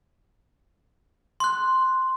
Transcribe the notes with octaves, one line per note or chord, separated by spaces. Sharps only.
C6 F#6